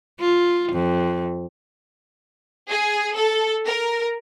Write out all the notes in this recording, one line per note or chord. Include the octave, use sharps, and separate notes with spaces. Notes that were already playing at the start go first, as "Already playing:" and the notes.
F4
F2
G#4
A4
A#4